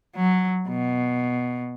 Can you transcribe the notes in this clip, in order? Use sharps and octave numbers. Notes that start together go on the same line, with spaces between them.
F#3
B2